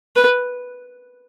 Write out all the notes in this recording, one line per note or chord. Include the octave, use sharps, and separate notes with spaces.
B4